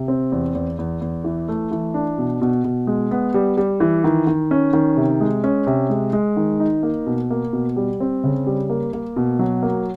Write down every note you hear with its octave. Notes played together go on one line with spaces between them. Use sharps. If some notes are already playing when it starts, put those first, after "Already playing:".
Already playing: C3
C4
E2
E2
E2
E2
E3
A3
E3
D4
B2
B2
B2
G#3
B3
G3
G3
E3
D#3
D#3
C#4
D#3
C3
G#3
C#4
C3
G#3
G#3
D#3
D#4
A#3
B2
A#3
B2
G3
C4
C#3
G3
A#3
A#3
B2
F#3
A#3